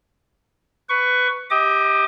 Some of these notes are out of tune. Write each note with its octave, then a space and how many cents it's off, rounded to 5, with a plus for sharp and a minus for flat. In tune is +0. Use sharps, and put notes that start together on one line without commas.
B4 +15 C#6 +10
G4 +0 D#5 +35 D6 +30